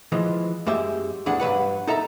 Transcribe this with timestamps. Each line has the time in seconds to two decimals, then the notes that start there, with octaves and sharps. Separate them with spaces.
0.12 E3 F3 G#3
0.66 F#2 G#3 G4 E5
1.26 E2 A2 D4 G#4 F#5
1.40 G2 F#3 B4 F#5
1.87 D#4 A4 E5 A#5